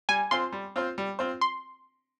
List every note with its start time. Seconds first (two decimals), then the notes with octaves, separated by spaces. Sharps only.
0.09 G3 G#5
0.31 C4 F4 C5 C6
0.52 G3
0.76 C4 F4 C5
0.98 G3
1.19 C4 F4 C5
1.41 C6